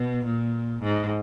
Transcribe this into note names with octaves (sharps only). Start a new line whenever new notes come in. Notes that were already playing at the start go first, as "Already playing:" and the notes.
Already playing: B2
A#2
G#2